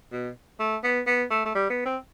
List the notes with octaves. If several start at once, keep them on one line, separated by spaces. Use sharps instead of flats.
B2
A3
B3
B3
A3
A3
G3
B3
C4